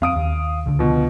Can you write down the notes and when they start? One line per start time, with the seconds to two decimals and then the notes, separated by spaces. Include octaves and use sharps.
0.02 F2 C4 F5 D#6 D7
0.16 D#2
0.66 C#2 D3
0.79 B2 F3